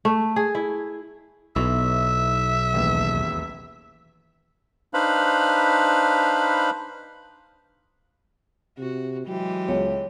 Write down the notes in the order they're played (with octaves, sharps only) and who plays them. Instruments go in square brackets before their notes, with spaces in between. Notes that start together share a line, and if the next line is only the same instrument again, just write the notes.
[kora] A3
G#4
E4
[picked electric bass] B1 [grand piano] B3 D#4 E4 [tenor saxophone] E5
[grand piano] E1 A1 D#2
[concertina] D4 D#4 B4 C5 F5 B5
[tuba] C3 [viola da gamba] F#4
[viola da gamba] E3 G#3 G4 [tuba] F#3
[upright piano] C#2 [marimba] C#5